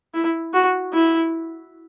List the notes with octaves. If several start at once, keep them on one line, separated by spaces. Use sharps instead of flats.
E4
F#4
E4